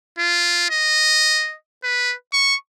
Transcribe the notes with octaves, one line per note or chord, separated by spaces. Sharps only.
F4
D#5
B4
C#6